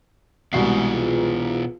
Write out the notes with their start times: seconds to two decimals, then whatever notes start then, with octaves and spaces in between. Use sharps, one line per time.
0.53 C2 B2 E3 G#3 F#4 D#6 C7
0.91 F4 G#4 B4